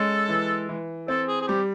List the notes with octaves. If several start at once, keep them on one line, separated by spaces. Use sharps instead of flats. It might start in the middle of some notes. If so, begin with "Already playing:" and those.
Already playing: G#3 C#4 A4
E3
E3
C4 A4
G#4
G#4
G3 G4